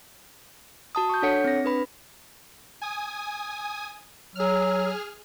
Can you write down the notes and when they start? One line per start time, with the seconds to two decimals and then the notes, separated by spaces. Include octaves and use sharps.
0.95 F#4 A5 D#6
1.09 C#6 G6
1.22 D4 A4 C#5 F#5 C#7
1.44 C4 A#6
1.65 D4 B4 B5
2.82 G#5 D#6
4.35 F#3 G#4 F6